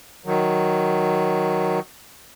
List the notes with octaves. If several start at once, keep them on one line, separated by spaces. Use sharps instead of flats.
D#3 F#3